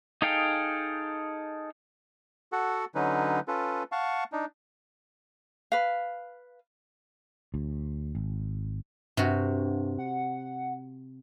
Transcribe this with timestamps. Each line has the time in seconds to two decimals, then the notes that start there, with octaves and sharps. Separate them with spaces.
0.22 D#4 G#4 A4 F5 G5
2.52 F#4 A4 F#5
2.95 D3 F#3 C#4 D#4 B4
3.48 C#4 F4 A4 B4
3.92 F5 F#5 A5 C#6
4.32 D4 D#4
5.72 B4 F5
7.54 D2
8.15 G#1
9.17 G2 C3 F#4
9.99 F#5